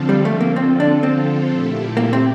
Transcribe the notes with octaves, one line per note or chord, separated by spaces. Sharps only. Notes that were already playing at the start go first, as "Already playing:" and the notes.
Already playing: D3 F3 C4 F4 A4
G3
A3
A#3
C4
D4
C4
A#2 A3 E4 G4
A#3
C4